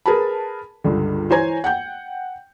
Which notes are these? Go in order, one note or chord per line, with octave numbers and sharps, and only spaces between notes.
G#4 A#4 B4 A5 B5
C#2 G2 D3
E3 C5 C#5 G#5 A#5 G#6
F#5 G5 G6